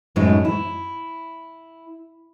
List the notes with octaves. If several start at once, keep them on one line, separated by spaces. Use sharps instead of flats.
F#2 A2 F#3 G#3 D#4
E4